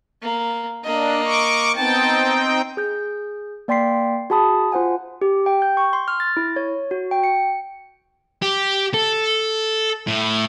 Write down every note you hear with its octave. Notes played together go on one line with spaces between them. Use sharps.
A#3
A#3 D4 D#5
C#6 D6
B3 C4 D#4 G5 A5
G#4 G6
A#3 D5 G5 C6 B6 C7
F#4 G#4 A5 B5 D#6
F4 C5 F#5 G#5
G4
G5
G6
C#6
C6
F6
A6
E4
C#5
F#4
G5
C#7
G4
A4
A2